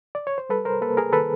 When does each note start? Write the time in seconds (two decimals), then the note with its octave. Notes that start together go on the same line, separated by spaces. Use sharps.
0.15 D5
0.27 C#5
0.38 C5
0.49 G3 A4 B4
0.65 A#4 C5
0.81 A#3 A4 B4
0.97 G#4 A#4
1.12 D#3 A4 B4